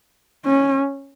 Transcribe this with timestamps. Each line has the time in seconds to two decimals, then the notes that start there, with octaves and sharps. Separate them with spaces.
0.45 C#4